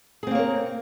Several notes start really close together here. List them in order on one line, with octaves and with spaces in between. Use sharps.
G#4 C4 A#3 C#5 A#4